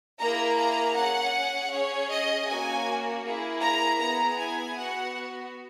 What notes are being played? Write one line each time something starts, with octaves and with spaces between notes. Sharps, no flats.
A#3 E4 G#4 A#5
A#5
C#4 G#4 F#5
C#4 G#4 C#5
D#5
A#3 C#4 F#4 G#5
A#3 E4 G#4
A#5
B3 E4 G#4 A#5
G#5
B3 F#4 F#5